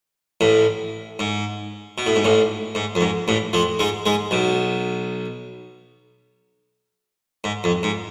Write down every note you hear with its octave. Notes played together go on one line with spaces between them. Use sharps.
A1 A2
G#2
B2
A2
G#2
A1 A2
G#2
F2
G#2
A1 A2
F2 F3
G#2 G#3
G#2 G#3
B1 B2
G#2
F2
G#2